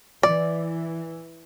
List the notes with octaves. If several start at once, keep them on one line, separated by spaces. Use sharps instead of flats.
E3 D5